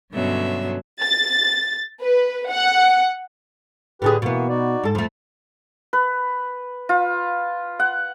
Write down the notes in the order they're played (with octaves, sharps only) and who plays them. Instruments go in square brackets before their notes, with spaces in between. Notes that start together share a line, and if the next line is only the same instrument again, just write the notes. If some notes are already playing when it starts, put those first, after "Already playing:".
[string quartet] G2 B2 D3 F#3 C#4 E5
[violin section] A6
B4
F#5
[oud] A2 D3 G#4 [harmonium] G4 B4
[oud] B2 B3 [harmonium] E3 A#3 F#4
[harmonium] D#4 F#4 D5
[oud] G#2 A4
F2 A3
[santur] B4
F4
F#5